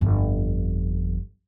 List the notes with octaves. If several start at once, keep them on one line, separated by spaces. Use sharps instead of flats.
G1 F2